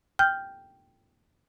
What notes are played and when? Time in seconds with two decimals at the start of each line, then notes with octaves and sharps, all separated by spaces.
0.19 G5 F6 G6